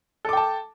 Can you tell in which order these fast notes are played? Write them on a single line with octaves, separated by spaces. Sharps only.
A4 D6 G5 A5